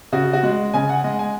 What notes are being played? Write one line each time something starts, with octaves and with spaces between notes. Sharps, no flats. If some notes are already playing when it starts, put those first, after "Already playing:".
C#3 F#4
F#4
G#3
C#3 G#5
F#5
G#3 D#5
G#5